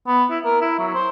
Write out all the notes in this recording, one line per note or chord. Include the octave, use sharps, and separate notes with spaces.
B3
E4
A#4
E4
F#3
C5